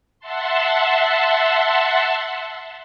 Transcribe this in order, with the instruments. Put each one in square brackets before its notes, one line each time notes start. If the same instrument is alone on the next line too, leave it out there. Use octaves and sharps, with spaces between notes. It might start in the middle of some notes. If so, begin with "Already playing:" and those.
[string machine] E5 F#5 A5 C6